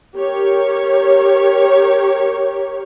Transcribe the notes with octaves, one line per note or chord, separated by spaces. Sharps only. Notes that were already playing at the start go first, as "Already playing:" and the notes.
G4 A#4 C#5